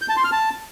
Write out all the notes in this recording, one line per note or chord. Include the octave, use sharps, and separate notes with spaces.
G6
A5
C6
F6
A5